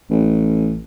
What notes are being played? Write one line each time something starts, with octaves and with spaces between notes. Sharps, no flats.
A1